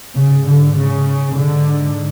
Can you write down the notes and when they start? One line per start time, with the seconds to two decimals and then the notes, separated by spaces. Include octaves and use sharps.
0.16 G#2 C#3
0.46 D3
0.76 C#3
1.35 G#2 D3